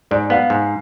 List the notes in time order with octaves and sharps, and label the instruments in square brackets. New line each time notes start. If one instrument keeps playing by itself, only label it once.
[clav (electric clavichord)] G#2 [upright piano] D5
[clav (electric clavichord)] B3 [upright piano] F5
[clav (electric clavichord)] G#2